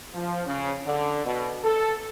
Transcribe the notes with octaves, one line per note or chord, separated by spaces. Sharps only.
F3
C#3
D3
B2
A4